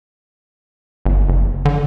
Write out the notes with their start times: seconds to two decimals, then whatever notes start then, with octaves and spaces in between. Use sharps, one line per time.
1.05 G1
1.29 F#1
1.65 D3